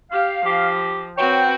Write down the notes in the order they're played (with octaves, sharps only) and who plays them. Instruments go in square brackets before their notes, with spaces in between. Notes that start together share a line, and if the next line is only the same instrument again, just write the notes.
[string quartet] G4 [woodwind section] F5
[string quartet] F3 [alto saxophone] G4
[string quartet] C4 F#4 B4 [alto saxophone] C#5 [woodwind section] G5